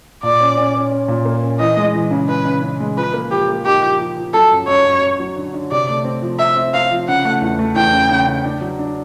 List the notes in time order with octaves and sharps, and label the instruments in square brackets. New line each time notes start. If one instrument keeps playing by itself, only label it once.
[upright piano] A#2 [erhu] D5
[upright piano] C#4
C#4
C#4
C#4
A#2
A#3
C#4
[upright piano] E3 [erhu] D#5
[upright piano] G#3
E3
C#3
[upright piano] C#3 [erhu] B4
[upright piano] C#3
C#3
G#3
[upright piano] F3 [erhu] B4
[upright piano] A#3
[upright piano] F3 [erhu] G4
[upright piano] A#3
[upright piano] D#4 [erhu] G4
[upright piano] F3
F3
F3
[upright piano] F#3 [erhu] A4
[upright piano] F#2
[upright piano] F#2 [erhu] C#5
[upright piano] F#2
F#2
F#3
D3
D3
[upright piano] C3 [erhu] D5
[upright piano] A3
C4
F3
[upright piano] C4 [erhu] E5
[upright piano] C4
[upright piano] C4 [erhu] F5
[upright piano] F3
[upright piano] C#3 [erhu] F#5
[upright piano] A3
E2
A3
[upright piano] E2 [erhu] G5
[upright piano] C#3
C#3
C#3
D4
F#3
D4